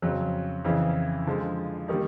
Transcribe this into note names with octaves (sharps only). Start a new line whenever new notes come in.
F2 C#3 F#3
F2 C#3 E3
D3 F3 G#3
D#3 G3 A#3 D#4